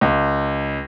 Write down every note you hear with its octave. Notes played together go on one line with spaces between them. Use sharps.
C#2